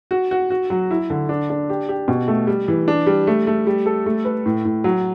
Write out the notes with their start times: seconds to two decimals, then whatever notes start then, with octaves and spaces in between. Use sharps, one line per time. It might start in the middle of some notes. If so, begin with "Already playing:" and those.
0.11 F#4
0.31 F#4
0.50 F#4
0.70 F#3
0.91 E4
1.10 D3
1.29 D4
1.50 D4
1.70 G4
1.89 G4
2.08 B2
2.28 A3
2.47 G3
2.68 E3
2.88 D4
3.07 G3
3.27 A3
3.47 A3
3.67 G3
3.86 A4
4.06 A3
4.25 B4
4.46 A2
4.65 A2
4.84 F#3